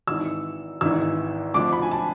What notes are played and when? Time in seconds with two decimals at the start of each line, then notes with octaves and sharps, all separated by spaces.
0.07 G#1 G#2 E3 E6
0.81 G#1 G#2 E3 E6
1.54 F2 D3 F3 A3 D4 D6
1.73 B5
1.82 G#5
1.91 A5